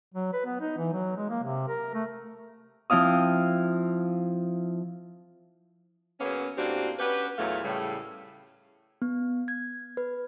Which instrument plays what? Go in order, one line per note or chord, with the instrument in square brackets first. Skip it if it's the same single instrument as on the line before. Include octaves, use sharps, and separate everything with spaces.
[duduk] F#3
B4
B3
D#4
E3
F#3
G#3
A#3
C3
A#4
A3
[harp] F3 C4 E4 F5 D#6
[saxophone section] C#3 F#3 A#3 B3 C#4
A2 A#3 C4 D4 F#4 G4
C#4 F#4 G4 B4
E2 A#2 E3 F#3 A3 F5
A2 C#3 G3
[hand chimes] B3
G#6
B4